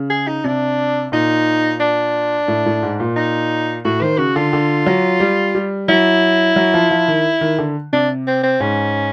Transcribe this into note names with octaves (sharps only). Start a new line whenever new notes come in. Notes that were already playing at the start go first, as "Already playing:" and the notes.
Already playing: C#3
G#4
D#4
C3 D4
A#2 D#4
D4
A2
A2
G#2
A#2
D#4
A2 F#4
D#3 C5
C#3 F#4
D3 F4
D3
F#3
G3
G3
F#3 E4
F#3
F3
F3
D#3
D#3
D3
C3 D4
C4
C4
G#2 C#4